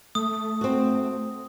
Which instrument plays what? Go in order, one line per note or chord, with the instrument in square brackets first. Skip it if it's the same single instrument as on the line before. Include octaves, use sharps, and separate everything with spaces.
[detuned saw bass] A3 [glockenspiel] D#6
[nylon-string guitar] C4 F#4